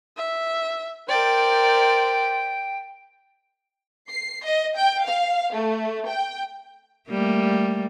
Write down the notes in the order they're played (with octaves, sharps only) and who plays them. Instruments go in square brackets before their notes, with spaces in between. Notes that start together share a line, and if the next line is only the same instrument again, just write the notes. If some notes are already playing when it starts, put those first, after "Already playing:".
[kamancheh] E5
[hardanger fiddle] A#4 D5 [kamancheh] C5 [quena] G5
[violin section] C7
D#5
G5
F5
A3
G5
[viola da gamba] G3 A3 A#3